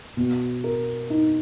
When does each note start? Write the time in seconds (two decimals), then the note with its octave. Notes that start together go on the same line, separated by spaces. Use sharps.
0.17 B2
0.64 A#4
1.10 D#4